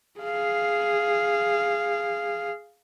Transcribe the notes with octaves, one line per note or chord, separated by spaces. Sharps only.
G#4 F5